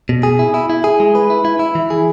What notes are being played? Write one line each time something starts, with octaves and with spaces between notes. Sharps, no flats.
B2
G#4
E4
E4
E4
G#4
G#3
B4
E4
E4
E4
E3
G#4